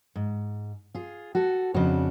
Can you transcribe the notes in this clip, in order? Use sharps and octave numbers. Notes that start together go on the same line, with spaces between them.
G#2
F4 G#4
F#4 A4
F2 C#3 D4 F#4